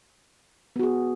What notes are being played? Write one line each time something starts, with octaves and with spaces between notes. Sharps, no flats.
B3 F#4 G#4